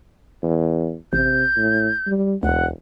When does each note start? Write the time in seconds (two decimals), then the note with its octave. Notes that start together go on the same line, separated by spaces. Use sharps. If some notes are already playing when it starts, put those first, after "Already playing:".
0.43 E2
1.13 A1 C3 G6
1.57 A2
2.07 G3
2.43 E1 D2 F#5